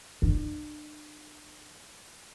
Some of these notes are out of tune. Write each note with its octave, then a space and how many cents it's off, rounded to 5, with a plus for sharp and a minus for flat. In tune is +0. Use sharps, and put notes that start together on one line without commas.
D4 +40